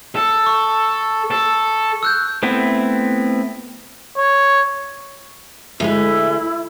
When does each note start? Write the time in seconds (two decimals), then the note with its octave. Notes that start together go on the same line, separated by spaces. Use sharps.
0.15 A4
0.46 C#6
1.31 A4
2.03 E6 F#6 G6
2.43 A3 B3 C4 E4
4.17 C#5
5.80 D2 G#3 E4 B4